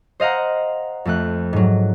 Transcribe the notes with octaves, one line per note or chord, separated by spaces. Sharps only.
C5 D#5 F5 F#5 A#5
F2 A3 F#6
G#2 F#3